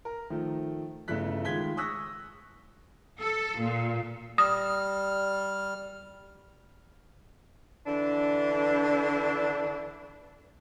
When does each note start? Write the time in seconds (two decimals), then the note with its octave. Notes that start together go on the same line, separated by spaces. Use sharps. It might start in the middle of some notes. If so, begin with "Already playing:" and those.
0.05 A#4
0.30 D#3 F3 A3
1.08 G1 C#3 A3 E4 F#6 B6
1.45 D#3 G#3 F4 G#6 B6 G7
1.77 C#6 D#6 E6 F#6 A#6 B6
3.20 A4
3.60 A#2
4.38 G3 D#6 F6
7.87 D3 E3 D4